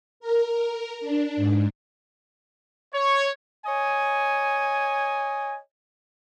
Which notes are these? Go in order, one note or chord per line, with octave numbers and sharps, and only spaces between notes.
A#4
D4
G#2
C#5
C#5 D#5 G#5